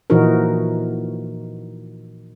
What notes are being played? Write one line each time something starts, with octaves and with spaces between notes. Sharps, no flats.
A#2 E3 F3 D#4 F#4 A#4